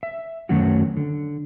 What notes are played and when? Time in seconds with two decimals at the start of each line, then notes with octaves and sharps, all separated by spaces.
0.03 E5
0.49 F#2 D#3 F#3 A3 C#4 F#4
0.97 D3